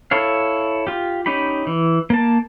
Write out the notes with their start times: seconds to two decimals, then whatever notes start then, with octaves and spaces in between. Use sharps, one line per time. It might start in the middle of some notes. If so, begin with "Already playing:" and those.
0.11 E4 A4 C#5 F5
0.87 F4 G4
1.26 C#4 D#4 G4 B5
1.67 E3
2.10 A#3 A5